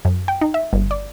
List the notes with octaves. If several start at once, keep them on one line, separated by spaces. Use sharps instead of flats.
F#2
G5
D#4
E5
G1
D5